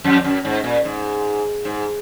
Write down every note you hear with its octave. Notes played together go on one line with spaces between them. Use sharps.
F2
F#2
G#2
A#2
G#2
G#2